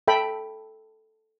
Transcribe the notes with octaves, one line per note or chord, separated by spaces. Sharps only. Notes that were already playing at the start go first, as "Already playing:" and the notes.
A4 E5 G5 B5